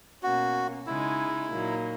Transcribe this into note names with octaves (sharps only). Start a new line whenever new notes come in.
B2 A#3 C#4 F#4
C#3 G#3 D#4 E4
A#2 F#3 A#3 D#4